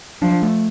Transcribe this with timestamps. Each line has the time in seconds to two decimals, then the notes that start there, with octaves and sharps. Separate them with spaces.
0.22 F3 D4
0.42 A3